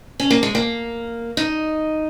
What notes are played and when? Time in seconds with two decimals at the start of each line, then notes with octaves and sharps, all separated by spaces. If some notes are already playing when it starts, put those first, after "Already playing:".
0.20 C#4
0.30 A#3
0.43 G#3
0.55 A#3
1.37 D#4